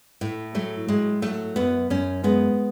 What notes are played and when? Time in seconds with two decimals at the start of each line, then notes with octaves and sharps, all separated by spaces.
0.21 A2 A3
0.55 F#3 A3
0.88 A2 G#3
1.22 F#3 A3
1.56 F#2 B3
1.90 F#2 C#4
2.24 G#3 B3